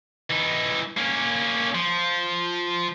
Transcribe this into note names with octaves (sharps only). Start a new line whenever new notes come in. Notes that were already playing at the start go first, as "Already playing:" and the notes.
E3 D#4
A#3 C#4
F3